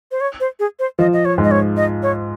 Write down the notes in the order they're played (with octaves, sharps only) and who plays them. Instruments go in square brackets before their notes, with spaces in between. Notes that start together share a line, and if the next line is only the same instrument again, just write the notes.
[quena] C5
C#5
C5
G#4
C5
[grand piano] F3 [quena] D#5
[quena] D#5
C#5
[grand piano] G#2
[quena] D#5
C#5
D#5
C#5